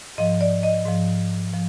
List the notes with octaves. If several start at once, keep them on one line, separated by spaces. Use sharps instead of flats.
G#2 F3 D#5
D5
D#5
G#2 F3
F3